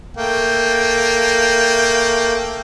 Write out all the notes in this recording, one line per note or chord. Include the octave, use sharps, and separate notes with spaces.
A3 A#3 G5